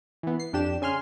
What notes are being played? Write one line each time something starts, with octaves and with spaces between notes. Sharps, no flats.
E3 B3
C7
F2 D4 G4 E7
C#3 G#5 C6 F6